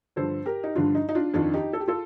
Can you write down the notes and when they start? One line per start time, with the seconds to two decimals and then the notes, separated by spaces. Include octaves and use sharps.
0.16 G2 D3 F3 A4 C5
0.46 G4 A#4
0.64 D#4
0.76 G2 D3 F3 D4 F4
0.95 D#4
1.09 D#4
1.15 D4 F4
1.34 F2 D#3 D4 F4
1.53 D#4 G4
1.73 A4
1.80 G4
1.88 F4 A4